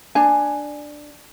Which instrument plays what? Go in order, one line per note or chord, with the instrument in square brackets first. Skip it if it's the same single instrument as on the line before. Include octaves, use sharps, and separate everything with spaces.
[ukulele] D4 G#5